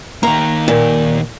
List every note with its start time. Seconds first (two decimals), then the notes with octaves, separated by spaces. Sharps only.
0.23 D#3 A#3 A#5
0.68 A#2